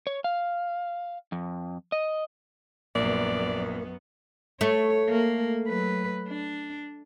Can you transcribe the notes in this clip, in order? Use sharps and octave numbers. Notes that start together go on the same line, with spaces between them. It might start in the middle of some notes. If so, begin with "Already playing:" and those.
C#5
F5
F2
D#5
A#1 F#2 A#3 B3 D5
A3 C#5
A#3
F#3 B4
D4